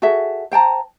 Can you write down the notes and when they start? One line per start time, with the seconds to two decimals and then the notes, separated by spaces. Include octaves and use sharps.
0.02 F#4 G#4 A4 E5
0.51 C5 G5 A5 A#5